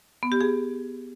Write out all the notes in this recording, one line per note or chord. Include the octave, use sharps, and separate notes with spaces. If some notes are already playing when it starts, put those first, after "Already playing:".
B3
G4
G#4